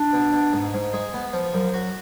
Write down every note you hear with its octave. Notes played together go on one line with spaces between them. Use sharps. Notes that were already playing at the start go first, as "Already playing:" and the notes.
Already playing: D4
B2
B2
G#2
G#2
G#3
B3
F3
F#2
F#4